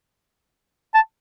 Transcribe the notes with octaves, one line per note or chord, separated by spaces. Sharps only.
A5